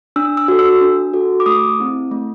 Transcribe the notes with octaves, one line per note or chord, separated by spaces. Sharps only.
D4 E6
E6
F#4 A4
E6
D4
F#4 A4
D6
A3 D#6
C4 E4 G#4
A3